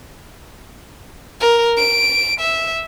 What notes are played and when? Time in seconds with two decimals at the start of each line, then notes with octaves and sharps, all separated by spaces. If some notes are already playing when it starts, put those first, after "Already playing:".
1.41 A#4
1.77 D7
2.40 E5